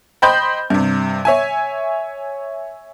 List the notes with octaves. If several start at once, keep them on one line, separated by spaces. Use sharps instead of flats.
C5 D#5 G5 B5 C6 G6
G2 C3
C#5 E5 G#5